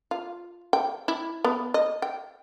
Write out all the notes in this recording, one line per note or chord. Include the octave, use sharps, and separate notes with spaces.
F4
G5
E4
B3
D#5
G5